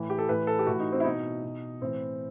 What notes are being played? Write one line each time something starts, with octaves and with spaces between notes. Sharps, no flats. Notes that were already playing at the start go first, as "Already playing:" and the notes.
Already playing: A2 E3
G4
A4
A2 E3 B4
A4
G4
A2 E3 F#4
D#4
C4
E4
B2 D#4
B2
A2 E3 C4